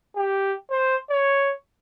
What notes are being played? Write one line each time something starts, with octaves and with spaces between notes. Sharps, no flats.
G4
C5
C#5